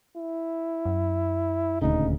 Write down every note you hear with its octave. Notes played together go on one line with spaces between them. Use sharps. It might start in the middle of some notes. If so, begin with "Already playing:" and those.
E4
F#2
D#1 D2 C#3 D#4